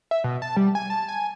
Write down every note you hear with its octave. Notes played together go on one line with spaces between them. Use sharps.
E5
B2
A5
G3
G#5
A5
G#5